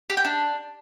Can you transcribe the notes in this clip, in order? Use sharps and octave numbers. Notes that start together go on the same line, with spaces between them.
G4
G5
D4